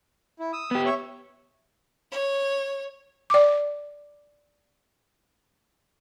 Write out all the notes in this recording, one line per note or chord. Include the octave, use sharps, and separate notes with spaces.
E4
D#6 E6
B3 G4
C#5 E5
C#5
D5 D6